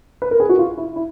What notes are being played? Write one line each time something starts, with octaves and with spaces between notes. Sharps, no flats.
B4
A#4
G#4
F#4
F4
E4
E4